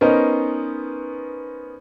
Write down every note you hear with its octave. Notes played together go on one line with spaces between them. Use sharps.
B3 C#4 D#4 A#4 C5